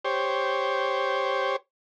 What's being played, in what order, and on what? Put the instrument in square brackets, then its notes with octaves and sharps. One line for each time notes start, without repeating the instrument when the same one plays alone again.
[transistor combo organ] G4 C5 C#5